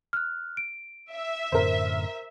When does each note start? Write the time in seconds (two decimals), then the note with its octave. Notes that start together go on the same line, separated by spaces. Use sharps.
0.13 F6 F#6
0.57 D7
1.12 E5
1.52 F#2 A2 D3 A#4 C5